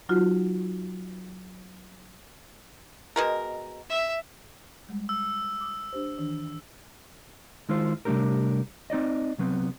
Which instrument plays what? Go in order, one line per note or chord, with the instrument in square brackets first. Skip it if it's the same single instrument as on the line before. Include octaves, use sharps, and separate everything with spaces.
[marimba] F#3 D#4 F4 F#4
[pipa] B2 G#3 A#4
[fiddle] E5
[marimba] G3 G#3
[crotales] E6
[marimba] D6 D#6
D4 G4 C5
D#3 E3 D4
[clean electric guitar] D#3 G#3 E4 F4 C5
C3 G3 A3 D4 G4 A#4
C4 D#4 D5 D#5
C2 F#3 B3 C4